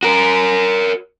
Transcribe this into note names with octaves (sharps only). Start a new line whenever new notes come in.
F#4 A#4